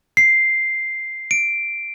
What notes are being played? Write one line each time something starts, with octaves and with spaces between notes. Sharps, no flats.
C7
D7